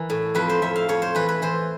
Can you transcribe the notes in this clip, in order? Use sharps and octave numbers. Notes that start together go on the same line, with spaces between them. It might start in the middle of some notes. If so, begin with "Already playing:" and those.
Already playing: E3 A#4
A2
F2 B4
C5
F2 E5
F5
F2 C#5
C5
E3 B4
B4
E3 C5